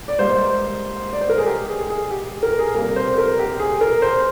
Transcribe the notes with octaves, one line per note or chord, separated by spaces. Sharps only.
D5
G#2 G3 A#3 C5
D5
C5
A#4
G#4
G4
G#4
G#4
G4
A#4
G#4
C3 G3 A#3 A#4
C5
A#4
G4
G#4
A#4
C5